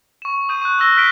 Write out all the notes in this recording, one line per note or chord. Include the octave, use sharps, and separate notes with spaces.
C#6 E7
D#6 G6 D#7
C#6 F#6
C#6 D#6 E6 A#6 G7
F6 F#6 B6 C7 D7 G7